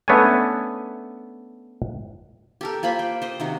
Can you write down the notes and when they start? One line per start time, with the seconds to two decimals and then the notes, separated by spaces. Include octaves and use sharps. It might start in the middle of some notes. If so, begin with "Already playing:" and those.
0.08 A3 B3 C#4 D4 C#5 G#5
2.61 G4 A4 A#4
2.83 A#3 F4 C5 B5
2.99 G5
3.22 C5 D#5
3.40 C3 D#3 F#4